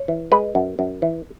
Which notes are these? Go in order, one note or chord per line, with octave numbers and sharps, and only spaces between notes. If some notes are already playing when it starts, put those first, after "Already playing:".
Already playing: C#5
E3
G#3 B4
F#2
F#2
E3